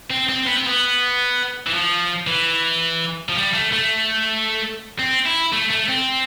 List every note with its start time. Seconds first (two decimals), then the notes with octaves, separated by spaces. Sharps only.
0.11 C4
0.29 C4
0.47 B3
0.57 C4
0.67 B3
1.67 E3
1.73 F3
2.27 E3
3.29 F3
3.36 G3
3.54 A3
3.72 A3
4.99 C4
5.26 E4
5.52 A3
5.70 A3
5.88 C4